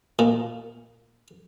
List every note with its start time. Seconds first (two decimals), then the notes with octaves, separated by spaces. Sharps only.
0.19 A#2